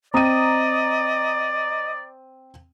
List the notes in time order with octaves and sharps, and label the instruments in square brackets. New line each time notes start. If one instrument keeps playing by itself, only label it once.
[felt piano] C4 D#7 [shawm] D5 [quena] D#5 [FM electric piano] A#5 D#6